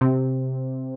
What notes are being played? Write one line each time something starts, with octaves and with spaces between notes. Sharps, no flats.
C3